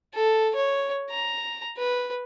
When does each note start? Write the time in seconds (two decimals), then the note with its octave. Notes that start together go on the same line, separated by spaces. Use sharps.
0.14 A4
0.56 C#5
1.10 A#5
1.78 B4